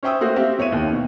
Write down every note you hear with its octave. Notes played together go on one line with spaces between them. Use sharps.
C#4 C5 E5 G5 D#6 E6
A3 A#3 F#4 C5 E5
C4 G4 E5 F5
E2 C#5 E5 D#7
D#2
B2